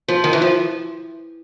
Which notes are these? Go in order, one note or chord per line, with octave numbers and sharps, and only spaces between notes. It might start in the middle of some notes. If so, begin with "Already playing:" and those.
F3
D#3
E3
F3